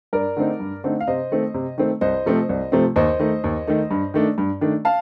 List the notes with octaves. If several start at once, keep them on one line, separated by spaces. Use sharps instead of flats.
G2 A#4 D5
D3 A3 C4 D#4
G2
D3 A3 C4 D#4
F5
C3 C5 D#5
D#3 A3 C4
C3
D#3 A3 C4
C2 C5 D#5
C3 F3 A3 C4
C2
C3 F3 A3 C4
D#2 C5 D#5
D#3 A3 D#4
D#2
D#3 A3 D#4
G2
D#3 A3 D4
G2
D#3 A3 D4
F5 A5